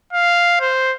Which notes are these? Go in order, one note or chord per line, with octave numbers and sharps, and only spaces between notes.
F5
C5